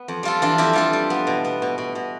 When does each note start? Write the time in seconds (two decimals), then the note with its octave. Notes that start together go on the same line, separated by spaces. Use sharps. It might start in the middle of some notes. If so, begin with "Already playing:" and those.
Already playing: B3
0.08 F2
0.23 G3 F4 A4
0.42 E3 D4 F4
0.58 F2 E4 G4
0.73 G3 F4 A4
0.93 G3
1.10 B3
1.27 B2
1.45 B3
1.62 B2
1.78 B2
1.95 B2